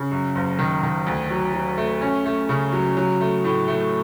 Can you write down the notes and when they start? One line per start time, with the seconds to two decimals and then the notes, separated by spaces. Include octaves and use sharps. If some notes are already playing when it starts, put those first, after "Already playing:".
Already playing: C#3
0.11 F#2
0.35 F#1
0.59 D#3
0.83 D#3
1.07 D2
1.30 F#3
1.54 F#3
1.78 A3
2.01 C#4
2.25 A3
2.49 C#3
2.73 F#3
2.97 F#3
3.21 A3
3.44 A2
3.68 A3